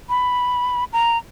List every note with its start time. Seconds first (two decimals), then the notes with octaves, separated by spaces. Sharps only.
0.09 B5
0.93 A#5